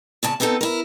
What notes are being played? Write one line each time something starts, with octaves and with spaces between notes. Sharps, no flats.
A#2 C#3 A5
B3 C4 D#4 F4 A4
E4 A#4